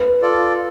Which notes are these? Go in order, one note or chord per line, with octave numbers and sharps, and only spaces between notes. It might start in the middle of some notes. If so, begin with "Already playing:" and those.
Already playing: B4
F4 A4 D5